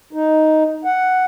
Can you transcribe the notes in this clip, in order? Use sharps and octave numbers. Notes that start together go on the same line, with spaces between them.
D#4
F#5